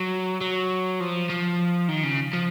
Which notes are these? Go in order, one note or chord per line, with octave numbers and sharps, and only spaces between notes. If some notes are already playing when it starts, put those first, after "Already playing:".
Already playing: F#3
F#3
F3
F3
D#3
C#3
F3